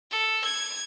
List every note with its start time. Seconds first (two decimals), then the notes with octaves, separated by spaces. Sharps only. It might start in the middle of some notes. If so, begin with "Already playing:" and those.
0.11 A4
0.44 G#6